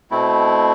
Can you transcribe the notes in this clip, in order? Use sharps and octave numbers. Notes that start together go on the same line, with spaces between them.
B2 A3 C4 E4